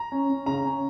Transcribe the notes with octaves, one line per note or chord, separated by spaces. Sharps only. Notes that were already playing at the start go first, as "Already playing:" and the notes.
Already playing: A#5
C#4
C#4
C#3 A#5
C#4